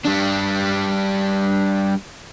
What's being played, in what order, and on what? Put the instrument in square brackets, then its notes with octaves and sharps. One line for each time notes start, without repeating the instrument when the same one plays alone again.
[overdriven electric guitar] G3 D4